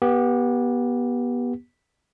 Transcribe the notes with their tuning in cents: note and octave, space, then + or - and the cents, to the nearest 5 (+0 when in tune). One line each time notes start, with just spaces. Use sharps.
B3 -25 G4 +0